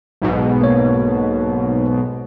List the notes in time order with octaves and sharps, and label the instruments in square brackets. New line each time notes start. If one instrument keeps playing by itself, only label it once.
[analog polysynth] B1 G#2 B2
[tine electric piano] A#3 C#5